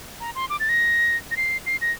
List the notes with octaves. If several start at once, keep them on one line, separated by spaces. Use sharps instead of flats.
A#5
C6
D6
A6
A#6
A#6
C7
C7
A#6